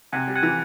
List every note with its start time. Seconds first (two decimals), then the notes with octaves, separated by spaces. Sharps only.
0.13 C3 F#5 G#5
0.28 G3
0.36 F#5 G#5
0.43 E3